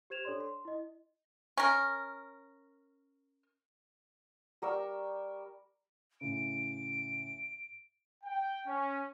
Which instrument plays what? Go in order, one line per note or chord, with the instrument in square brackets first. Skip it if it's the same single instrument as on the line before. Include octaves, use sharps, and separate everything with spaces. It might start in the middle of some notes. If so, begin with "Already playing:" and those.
[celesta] G4 C5 G#6 E7 F7
D4 A4 C#5 D5 C6
C6
E4 D#5
[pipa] C#4 A#4
[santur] G3 A#4 C#6 E6
[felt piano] A2 C#3 [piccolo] D7
[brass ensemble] G5
C#4